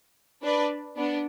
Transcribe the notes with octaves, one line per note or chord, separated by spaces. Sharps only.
D4 B4 D5
B3 D4